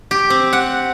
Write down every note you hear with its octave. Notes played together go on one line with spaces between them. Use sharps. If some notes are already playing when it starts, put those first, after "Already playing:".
G4
C4
F#5